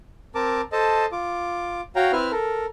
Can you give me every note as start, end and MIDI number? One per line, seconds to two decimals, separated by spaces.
0.35 0.61 60
0.35 0.61 70
0.35 0.61 81
0.35 0.61 86
0.72 1.06 69
0.72 1.06 72
0.72 1.06 75
0.72 1.06 81
1.12 1.81 65
1.12 1.81 86
1.96 2.12 66
1.96 2.12 73
1.96 2.12 77
1.96 2.12 79
1.96 2.12 82
2.12 2.32 60
2.12 2.32 64
2.12 2.32 71
2.12 2.32 76
2.12 2.32 89
2.32 2.66 69
2.32 2.66 70